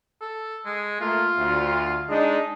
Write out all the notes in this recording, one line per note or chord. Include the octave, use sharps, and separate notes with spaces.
A4
G#3
A3 A#3 F4
D2
G#3 D4 D#4 D#5